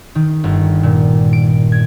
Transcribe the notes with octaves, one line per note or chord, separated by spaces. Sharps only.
D#3
G1
A#2
D7
G#6